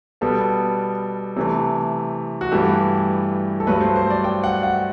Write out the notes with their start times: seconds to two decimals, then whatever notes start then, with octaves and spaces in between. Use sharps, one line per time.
0.21 B2 G3 B3 A4
1.37 C3 E3 A3
2.41 F#4
2.52 G2 E3 A3 G4
3.60 A4
3.67 G2 F#3 A3 B4
3.81 C5
3.96 C5
4.10 D5
4.24 G5
4.44 F#5
4.63 F#5